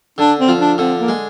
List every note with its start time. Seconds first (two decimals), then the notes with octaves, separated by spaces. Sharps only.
0.18 D3 D4
0.39 C4
0.48 F3
0.59 D4
0.78 D3 C4
0.99 A#3
1.08 G#3